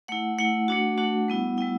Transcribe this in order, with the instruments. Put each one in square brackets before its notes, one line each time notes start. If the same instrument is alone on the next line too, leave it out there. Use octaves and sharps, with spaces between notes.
[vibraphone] A3 E4 F#5
A3 E4 F#5
A3 D4 F#4
A3 D4 F#4
G3 B3 E4
G3 B3 E4 G5